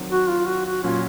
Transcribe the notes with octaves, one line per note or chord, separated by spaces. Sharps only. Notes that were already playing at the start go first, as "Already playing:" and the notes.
Already playing: D#3 F#3 C4
F#4
F4
F#4
F#4
A#2 F#3 C#4 F4